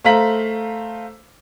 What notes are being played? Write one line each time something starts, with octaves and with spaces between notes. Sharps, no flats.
A3 C5 F5 A#5 B6 F#7